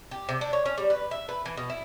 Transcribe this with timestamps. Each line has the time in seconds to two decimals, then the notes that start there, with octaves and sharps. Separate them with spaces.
0.11 G4
0.29 C3
0.41 D4
0.53 C#5
0.66 C#4
0.78 G3
0.90 B4
1.11 E5
1.29 B4
1.46 E3
1.57 B2
1.70 E4